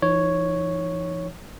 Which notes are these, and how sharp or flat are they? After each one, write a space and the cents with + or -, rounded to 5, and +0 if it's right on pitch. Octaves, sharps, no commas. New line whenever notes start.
E3 +45 D#4 +0 C#5 +0